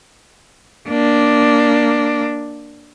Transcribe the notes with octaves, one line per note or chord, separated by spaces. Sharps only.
A#3 D4